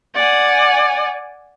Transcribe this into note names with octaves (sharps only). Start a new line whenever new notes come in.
D5 F#5 G#5